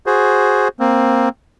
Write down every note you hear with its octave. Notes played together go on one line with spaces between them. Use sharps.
F#4 G#4 C5
A#3 C4